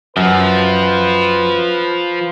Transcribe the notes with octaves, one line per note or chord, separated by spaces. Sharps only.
F#2 F3 B4